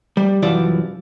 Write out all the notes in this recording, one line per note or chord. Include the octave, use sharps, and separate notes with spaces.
G3
C2 F#2 E3 F3 D5